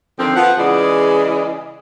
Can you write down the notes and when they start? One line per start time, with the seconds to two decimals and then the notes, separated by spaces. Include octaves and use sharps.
0.19 D3 D#3 F3 C4
0.36 F3 B3 F#5
0.57 C#3 E3 G#3 G#4 D5 D#5